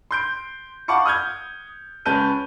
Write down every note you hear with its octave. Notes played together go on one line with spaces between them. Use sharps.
C6 G6 D7
F5 F#5 A5 C#6 D6 C#7
D#6 F6 G6 G#6
C#2 C#4 B4 A5 G6 D#7